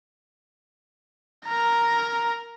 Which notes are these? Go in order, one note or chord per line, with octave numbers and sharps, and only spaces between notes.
A#4 A#5